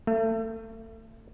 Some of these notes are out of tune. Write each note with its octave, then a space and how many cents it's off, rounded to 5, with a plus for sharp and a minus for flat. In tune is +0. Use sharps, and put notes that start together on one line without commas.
A3 +30